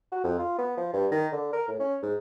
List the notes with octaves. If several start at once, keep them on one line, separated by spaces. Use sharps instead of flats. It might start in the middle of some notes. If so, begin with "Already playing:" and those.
F#4
F2
F4
B3
F3
G2
D#3
D3
A#4
A2
C#4
G#2